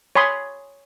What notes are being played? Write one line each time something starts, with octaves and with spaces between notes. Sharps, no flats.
C#5 G#5 B5 C6 D#6